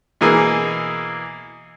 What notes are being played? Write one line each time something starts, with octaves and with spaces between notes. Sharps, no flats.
B2 E3 A#3 G#4